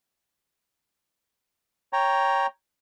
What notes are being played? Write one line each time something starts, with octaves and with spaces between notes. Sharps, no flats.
C#5 G5 A#5